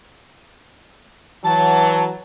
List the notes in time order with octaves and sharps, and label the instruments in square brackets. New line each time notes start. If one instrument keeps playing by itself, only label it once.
[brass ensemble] E3 F#3 [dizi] A5